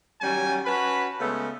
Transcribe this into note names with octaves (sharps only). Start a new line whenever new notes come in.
D#3 F#3 G3 C#4 G#5
C#4 F#4 B4 A5 B5
C#3 G#3 A3 B3 C#4